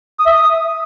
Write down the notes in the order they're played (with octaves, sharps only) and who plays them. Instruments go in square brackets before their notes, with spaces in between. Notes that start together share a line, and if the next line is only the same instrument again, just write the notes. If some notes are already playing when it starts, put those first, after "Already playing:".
[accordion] D#6
E5
D#6